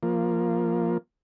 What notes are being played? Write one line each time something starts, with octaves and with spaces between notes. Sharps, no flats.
F3 A#3